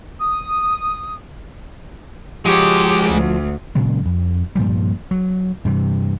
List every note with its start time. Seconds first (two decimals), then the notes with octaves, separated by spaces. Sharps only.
0.20 D#6
2.46 F3 G#3 F#4 G4 C#5
3.09 D2
3.75 A#2 C#3 F#3 G#3
4.05 F2
4.55 G2 A#2 F3 G3
5.11 F#3
5.65 G2 C3 E3